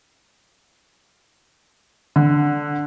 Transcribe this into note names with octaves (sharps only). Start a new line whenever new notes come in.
D3